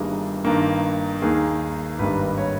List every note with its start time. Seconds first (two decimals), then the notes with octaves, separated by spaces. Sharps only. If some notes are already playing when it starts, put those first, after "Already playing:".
Already playing: G1 G2 D#3 G3 A#3 G#4
0.45 G2 D#3 A#3
1.22 D#2 D#3 A#3 G#4
1.99 G#1 G2 D#3 G3 A#3 B4
2.38 C#5